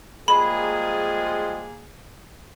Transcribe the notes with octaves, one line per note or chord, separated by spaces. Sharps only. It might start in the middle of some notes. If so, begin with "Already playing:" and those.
F3 G3 G#3 A#3 G#4 B5